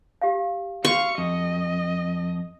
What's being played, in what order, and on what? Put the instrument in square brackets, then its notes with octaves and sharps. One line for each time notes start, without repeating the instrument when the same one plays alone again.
[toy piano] G4 F5
[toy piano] F#4 [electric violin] F5 C#7 [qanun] C#6
[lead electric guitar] F2 [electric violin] D#5